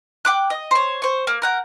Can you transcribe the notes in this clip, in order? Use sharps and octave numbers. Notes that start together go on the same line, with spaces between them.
G5 D6 F#6
D#5
C5 C#5
C5 C#6
A#3
A#4 F#5 G6